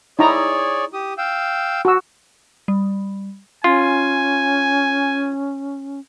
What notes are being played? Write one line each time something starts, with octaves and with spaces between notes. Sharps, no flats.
D#4 E4 G#4 C#5 D5 A#5
G4 D#6
F5 G5 E6
F#4 E6
G3
C#4 F4 G#5